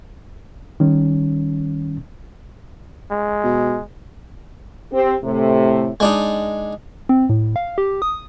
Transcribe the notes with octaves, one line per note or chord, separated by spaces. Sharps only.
D#3 G3 C#4
G#3
B2
C4 G4
A2 C3 A3
G#3 D4 D#4
C4
A2
F5
G4
D#6